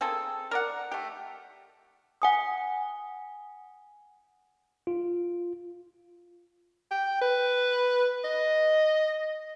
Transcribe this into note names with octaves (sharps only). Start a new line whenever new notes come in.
A#3 C4 G#4 A4
A#4 D5 F#5
A3 G4
F#5 G#5 D#6
F4
G5
B4
D#5